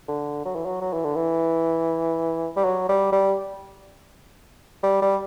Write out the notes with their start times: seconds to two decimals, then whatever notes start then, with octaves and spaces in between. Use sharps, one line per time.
0.09 D3
0.45 F#3
0.55 E3
0.66 F#3
0.81 F#3
0.93 E3
1.04 D3
1.16 E3
2.57 G3
2.65 F#3
2.89 G3
3.12 G3
4.84 G3
5.02 G3